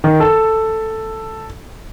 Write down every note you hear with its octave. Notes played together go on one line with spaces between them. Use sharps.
D#3
A4